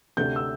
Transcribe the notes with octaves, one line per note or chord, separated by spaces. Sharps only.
D2 C3 A3 C4 G6
E6